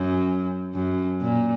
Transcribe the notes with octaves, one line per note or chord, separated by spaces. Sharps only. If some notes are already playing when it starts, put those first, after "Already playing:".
Already playing: F#2
F#2
A#2